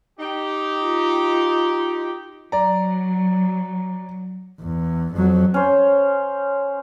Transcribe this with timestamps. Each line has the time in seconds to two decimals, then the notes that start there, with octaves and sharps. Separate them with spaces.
0.20 D#4 G4
0.82 F4
2.52 F#3 D5 A#5
4.61 E2
5.15 F2 F#3
5.54 C#4 C5